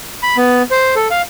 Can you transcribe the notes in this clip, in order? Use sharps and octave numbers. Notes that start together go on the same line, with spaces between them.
B5
B3
C5
A4
F5